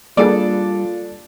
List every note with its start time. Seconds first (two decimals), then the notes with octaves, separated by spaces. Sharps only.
0.17 G3 A#3 D4 F4 G#4 A4 D5